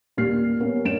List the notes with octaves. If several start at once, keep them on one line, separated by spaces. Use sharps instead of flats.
D#1 A#2 G4 F6 C7
B3 C#4 A#4
G1 F#2 D7 E7